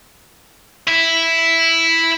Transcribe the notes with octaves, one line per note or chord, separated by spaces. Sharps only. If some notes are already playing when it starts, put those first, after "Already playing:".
E4